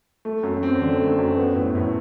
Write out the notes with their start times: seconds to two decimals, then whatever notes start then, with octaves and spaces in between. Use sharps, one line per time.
0.25 A3
0.43 F#2
0.63 C4
0.81 D3
1.00 A3
1.19 F#2
1.37 B3
1.56 A2
1.75 A2